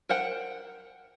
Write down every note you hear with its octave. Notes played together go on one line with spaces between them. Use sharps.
A#4 C5 F#5 G5